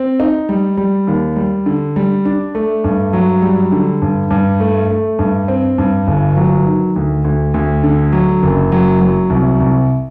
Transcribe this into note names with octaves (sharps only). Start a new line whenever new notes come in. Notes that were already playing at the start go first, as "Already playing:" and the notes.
Already playing: C4
D#4
G3
G3
D#2
G3
D3
G3
D4
A3
G2
F#3
G3
D3
G2
G2
A3
A3
G2
C4
G2
G1
F#3
D#3
D2
D2
D2
D3
F#3
F#1
F#3
F#3
C2
C2